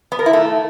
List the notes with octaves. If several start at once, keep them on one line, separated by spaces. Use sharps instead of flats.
B3
A#4
E4
A3